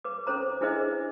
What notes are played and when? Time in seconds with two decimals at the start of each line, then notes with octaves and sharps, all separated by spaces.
0.04 B4 D6
0.27 C#4 A4 C5 A#5
0.61 D4 E4 G#4 B4 C5 D#5